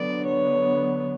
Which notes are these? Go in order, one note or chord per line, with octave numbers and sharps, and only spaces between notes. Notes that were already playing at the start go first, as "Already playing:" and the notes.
Already playing: D3 F#3 B3 D5
C#5